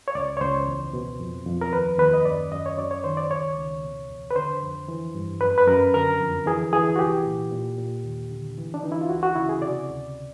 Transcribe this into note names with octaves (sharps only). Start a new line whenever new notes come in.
C#5
C#2 D5
C#5
C#2 C5
E2
B2
F2
F2
A#4
D#2 B4
D#2 B4
D#5
F#2 D5
F#2 D#5
C#5
F#2 D5
C#5
D#3 C5
D5
C#2 C#5
C#2
B2
E2
B4
D3 C5
F2
E3
G2
F#2 B4
B4
F#2 A#4
D3 A#4
F2
E3 G#4
E3 G#4
F#4
C2 G4
A#2
A#2
A#2
D#2
D3
E3
D4
E3 D#4
E4
F4
D2 F#4
F#4
C#3 E4
G#4
C3 D5
D2